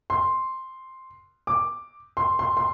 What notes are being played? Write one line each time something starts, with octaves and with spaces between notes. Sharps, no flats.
C6
D6
C6
C6
C6